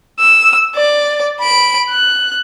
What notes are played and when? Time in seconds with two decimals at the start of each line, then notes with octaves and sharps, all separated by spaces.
0.20 E6
0.75 D5
1.41 B5 D7
1.90 F#6